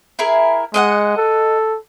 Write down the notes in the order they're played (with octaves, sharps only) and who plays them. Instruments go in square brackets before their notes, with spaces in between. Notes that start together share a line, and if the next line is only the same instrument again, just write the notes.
[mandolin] E4 G#4 A#4
[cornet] G#3 [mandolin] D#5 F5 F#5
[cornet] A4